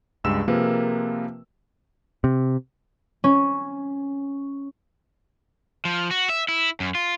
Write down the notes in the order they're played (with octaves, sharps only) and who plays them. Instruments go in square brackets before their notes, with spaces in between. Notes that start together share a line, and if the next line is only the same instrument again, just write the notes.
[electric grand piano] C#2 G2 G#3 E6 E7
C3 F3 A#3 G#4 A#4 B4
[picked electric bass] C3
[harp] C#4
[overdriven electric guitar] F3
F#4
E5
E4
F#2
F4